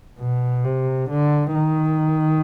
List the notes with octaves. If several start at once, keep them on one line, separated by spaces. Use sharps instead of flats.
B2
C3
D3
D#3